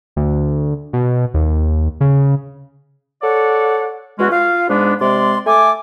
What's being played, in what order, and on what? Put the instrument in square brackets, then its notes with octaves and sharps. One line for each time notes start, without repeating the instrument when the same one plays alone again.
[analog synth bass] D2
B2
D#2
C#3
[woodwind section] A4 C#5 D5 F#5
E2 G#3 C#4 F#4
F4 F5
G#2 G#3 B3 D4
C3 G#3 D5 C6
A3 A4 G#5 D6